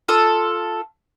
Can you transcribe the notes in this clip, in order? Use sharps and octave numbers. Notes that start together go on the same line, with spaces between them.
F4 A4 D#6